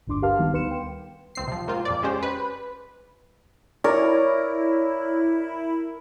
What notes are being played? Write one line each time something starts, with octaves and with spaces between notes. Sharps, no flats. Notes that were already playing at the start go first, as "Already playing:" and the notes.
G1 D2 G2 D4 C6 D6
G4 A#4 B4 F5 A5 F6
D#3 G3 B3 D#4
D2 B3 B4 C6 C#7 E7
G5
C#2 C4 C7
C3 F3
G#2 A#3 C4 F4
F2 A#2 D5
G#3 C#4 G4 C5
B4
E4 A#4 C#5 D5